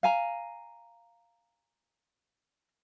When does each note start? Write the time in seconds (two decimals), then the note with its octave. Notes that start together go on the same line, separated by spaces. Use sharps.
0.03 F5 G#5 A#5